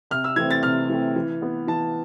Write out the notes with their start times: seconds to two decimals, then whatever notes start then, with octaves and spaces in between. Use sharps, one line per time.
0.11 C3 F6
0.24 E6
0.36 E3 A3 C4 G#6
0.51 A6
0.63 C3 F6
0.89 E3 A3 C4
1.16 E3
1.42 B3
1.67 E3 A5